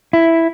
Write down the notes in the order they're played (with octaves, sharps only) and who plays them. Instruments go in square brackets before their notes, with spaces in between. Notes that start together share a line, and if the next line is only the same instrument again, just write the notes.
[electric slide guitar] E4